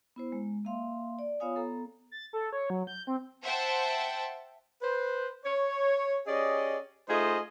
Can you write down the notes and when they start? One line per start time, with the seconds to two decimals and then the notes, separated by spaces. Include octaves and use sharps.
0.16 B3 E4 C5
0.32 G#3
0.65 A#3 E5 F5 C6
1.19 D5
1.40 B3 F4 C#5 F5 G#5 D#6
1.56 B3 A4 A#5
2.12 A6
2.33 A4
2.52 C#5
2.70 F#3
2.87 G6
3.07 C4
3.43 C5 E5 F#5 G5 A5
4.82 B4 C5
5.45 C#5
6.27 C#4 G4 G#4 D5 D#5
7.09 A3 D#4 F4 G#4 C5 D#5